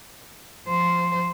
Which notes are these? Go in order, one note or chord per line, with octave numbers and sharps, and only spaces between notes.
F3 C5